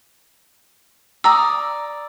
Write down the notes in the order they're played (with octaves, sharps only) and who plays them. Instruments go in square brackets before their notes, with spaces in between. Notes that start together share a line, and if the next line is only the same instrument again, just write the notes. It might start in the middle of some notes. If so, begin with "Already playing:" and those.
[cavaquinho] D5 A#5 D#6 [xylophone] E6